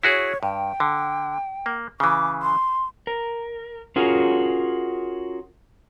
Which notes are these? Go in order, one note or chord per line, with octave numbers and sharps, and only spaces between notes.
E4 F#4 G#4 C#5
G2 G5
D3
A#3
C#3 E3 D6
C6
A#4
C#4 F4 F#4 G#4 A#4